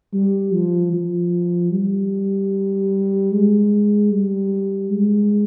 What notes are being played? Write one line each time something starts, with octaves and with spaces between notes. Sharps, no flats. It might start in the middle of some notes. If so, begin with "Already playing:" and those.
G3
F3
F3
G3
G#3
G3
G#3